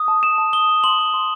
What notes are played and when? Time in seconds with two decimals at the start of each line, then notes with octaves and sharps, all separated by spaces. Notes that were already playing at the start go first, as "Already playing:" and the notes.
Already playing: D#6
0.08 A5
0.23 A5 E7
0.38 A5
0.53 D#6 G7
0.68 A5
0.84 C6 F#7
0.99 C6
1.14 C6